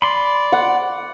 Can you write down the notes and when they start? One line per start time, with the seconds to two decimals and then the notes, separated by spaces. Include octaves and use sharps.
0.02 D5 B5 C6
0.52 F#5